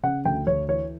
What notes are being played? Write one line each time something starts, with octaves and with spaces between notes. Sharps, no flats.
C#3 F#5
D2 G5
D2 C#5
E3 C#5